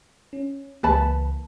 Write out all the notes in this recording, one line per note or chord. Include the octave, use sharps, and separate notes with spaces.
C#4
C#2 E3 A#3 B4 A5 B5